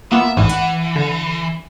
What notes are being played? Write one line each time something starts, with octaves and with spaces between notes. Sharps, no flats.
A#3 B3 F4 E5
A1 D2 G#2 E3
F#5
D3